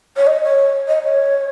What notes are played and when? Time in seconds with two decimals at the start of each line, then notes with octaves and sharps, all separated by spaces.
0.17 C#5
0.27 D#5
0.43 C#5
0.88 D#5
1.04 C#5